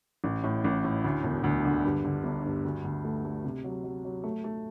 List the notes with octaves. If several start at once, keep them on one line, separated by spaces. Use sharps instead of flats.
A1
A2
A1
A2
D2
E1
D2
D3
G2
D3
G1
G2
D2
D2
A3
A3
C3
F#3
F#3
F#3
A3
A3